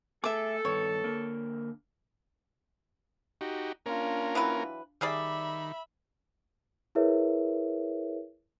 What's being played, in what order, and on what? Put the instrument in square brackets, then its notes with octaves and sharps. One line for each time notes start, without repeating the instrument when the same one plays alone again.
[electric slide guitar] A3 G#4 [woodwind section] A4 [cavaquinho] E5 D6
[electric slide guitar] G2 D#3 B3 [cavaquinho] C#5
[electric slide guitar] D3 A#3 A#4
[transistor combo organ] D#4 F#4 G4
[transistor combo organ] A#3 C#4 A#4 [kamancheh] D4 F4
[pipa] E3 F#3 B4
[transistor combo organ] D#3 [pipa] G3 G#4 D5 [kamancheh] E5 B5
[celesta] E4 G#4 A#4 B4 C#5 E5